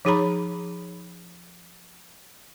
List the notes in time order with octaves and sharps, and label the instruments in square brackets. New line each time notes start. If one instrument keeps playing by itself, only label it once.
[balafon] F3 D#4 G#4 C#5 A#5 B5